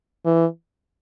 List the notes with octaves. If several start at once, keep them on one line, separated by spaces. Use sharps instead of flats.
E3